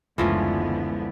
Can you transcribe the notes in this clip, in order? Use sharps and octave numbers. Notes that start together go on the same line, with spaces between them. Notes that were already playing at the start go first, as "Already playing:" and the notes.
F#1 D2 D3 E3 F3 G#3 B3 C#4